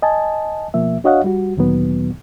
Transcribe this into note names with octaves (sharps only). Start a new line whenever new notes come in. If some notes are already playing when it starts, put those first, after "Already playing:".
D#5 G#5 A5
B2 F3 A#3 E5
D4 F#4 C#5 D#5 F5 F#5
G3 F#4
D2 A#2 D#3 F#3 B3